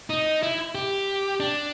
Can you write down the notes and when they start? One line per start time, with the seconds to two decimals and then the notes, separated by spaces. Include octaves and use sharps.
0.10 D#4
0.43 E4
0.75 G4
1.40 D4